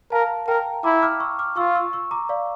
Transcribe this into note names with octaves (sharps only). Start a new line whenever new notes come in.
A#4 F5 A5
A#4 G5 A#5
E4 A#5 D6
D6 F6
C#6 E6
D6 F6
F4 C#6 E6
C#6 E6
C#6 E6
A#5 D6
D5 F5